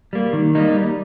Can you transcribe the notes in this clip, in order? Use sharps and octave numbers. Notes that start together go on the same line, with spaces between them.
G3 A#3
D#3
G3 A#3 D#4
G3